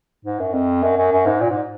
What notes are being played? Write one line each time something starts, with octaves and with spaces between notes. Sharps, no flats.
G#2
F#2
F2
F#2
F#2
F#2
G#2
A#2
G#2